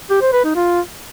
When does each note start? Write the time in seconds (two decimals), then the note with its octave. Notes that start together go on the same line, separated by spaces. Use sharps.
0.10 G4
0.22 C5
0.33 B4
0.44 D#4
0.56 F4